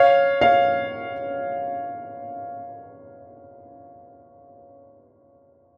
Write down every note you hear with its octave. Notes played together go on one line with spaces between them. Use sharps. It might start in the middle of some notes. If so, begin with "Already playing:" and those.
Already playing: C#5 F5
C#5 F5